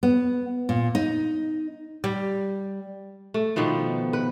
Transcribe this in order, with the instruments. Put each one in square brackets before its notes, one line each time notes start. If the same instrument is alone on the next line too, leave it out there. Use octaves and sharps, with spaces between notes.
[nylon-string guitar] B3
A#2
D#4
[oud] G3
[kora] A3
B2 D#3 F3 B3
B4